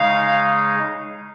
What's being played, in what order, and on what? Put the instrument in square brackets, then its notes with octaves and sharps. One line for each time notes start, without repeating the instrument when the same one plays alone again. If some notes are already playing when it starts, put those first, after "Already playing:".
Already playing: [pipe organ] C#3 G#3 D#4 [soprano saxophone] F5